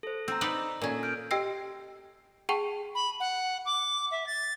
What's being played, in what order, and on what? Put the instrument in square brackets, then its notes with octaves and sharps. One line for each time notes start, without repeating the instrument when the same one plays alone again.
[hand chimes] A4 C5
[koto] C4 [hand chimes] A#5 E6
[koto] D#4 B4 D5
[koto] A#2 C#4 [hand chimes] A4 A#4
[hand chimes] F6 G6 D7
[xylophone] G4 D#5 G5 E6 A#6 C7
G#4 F#5 G5 A5 C#6 F7
[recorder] B5
F#5
D6
E5
A6